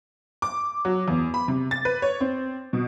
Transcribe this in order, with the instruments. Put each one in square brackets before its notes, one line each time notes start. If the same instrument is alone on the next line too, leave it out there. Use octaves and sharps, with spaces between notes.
[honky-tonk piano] D6
F#3
E2
B5
C3
A6
B4
C#5
C4
B2